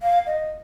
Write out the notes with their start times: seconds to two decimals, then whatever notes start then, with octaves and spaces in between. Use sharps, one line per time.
0.02 F5
0.27 D#5